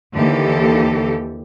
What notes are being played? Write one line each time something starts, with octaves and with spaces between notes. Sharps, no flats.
D#2 D3 E3 G4 A4